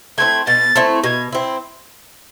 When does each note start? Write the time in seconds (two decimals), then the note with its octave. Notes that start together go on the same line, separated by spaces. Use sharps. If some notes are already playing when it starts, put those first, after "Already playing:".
0.18 A3 C4 E4 G#6
0.47 B2 A6
0.76 A3 C4 E4
1.04 B2 G#6
1.32 C4 E4